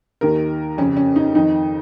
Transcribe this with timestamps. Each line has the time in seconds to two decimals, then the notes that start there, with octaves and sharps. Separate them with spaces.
0.21 D#2 D#3 A#4
0.78 F2 C#4
0.82 C#3
0.97 C#4
1.16 D#4
1.35 F2 D#3 D#4